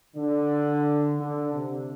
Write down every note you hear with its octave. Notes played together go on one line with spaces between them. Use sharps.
D3
D3
C3